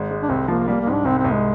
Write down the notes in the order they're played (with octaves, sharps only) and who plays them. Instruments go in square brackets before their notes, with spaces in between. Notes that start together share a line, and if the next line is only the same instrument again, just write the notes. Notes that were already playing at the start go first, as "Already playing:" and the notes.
Already playing: [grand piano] G#1 G#3
G#3
[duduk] D4
[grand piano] C2 [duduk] C4
[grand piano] F3 [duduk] A#3
[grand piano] G3 [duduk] A#3
[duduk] A#3
[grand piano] G#2
[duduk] D4
[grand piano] C2 [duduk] C4
[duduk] C4
[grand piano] C2
[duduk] G#3